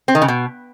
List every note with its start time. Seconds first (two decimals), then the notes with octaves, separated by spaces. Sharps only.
0.08 C4
0.15 D#3
0.22 C#3
0.28 B2